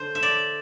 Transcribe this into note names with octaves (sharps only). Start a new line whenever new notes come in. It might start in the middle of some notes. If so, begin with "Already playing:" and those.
Already playing: D3 C5
E5
D5